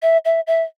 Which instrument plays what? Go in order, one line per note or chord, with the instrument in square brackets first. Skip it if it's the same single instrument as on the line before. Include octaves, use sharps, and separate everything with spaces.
[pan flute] E5
E5
E5